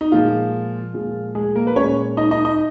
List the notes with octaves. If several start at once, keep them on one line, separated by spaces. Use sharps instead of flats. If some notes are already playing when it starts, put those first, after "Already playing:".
D#4
A#2 F3 G#3 F4
A#2 F3 G#3
G#3 G#4
A#3 A#4
B4
A#2 G#3 C#4 C#5
D#4 D#5
D#4 D#5
D#4 D#5